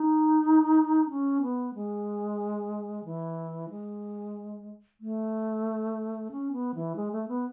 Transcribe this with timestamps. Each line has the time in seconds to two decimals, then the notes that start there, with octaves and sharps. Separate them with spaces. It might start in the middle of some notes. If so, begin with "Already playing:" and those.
Already playing: D#4
1.10 C#4
1.42 B3
1.75 G#3
3.05 E3
3.70 G#3
5.00 A3
6.32 C#4
6.53 B3
6.75 E3
6.96 G#3
7.12 A3
7.28 B3